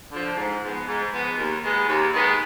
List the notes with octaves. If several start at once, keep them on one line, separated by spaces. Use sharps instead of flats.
D3 F3
G#2
F3 G#3 B3
G#2
F3 G#3 B3
D#2
D#3 G#3 B3
D#2
D#3 G#3 B3